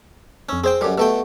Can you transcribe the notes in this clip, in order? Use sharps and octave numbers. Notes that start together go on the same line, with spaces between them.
F2 C#4 E6
C4 G#4 C5 G5
F#2 G3 G4 A4
B2 A3 G5 E6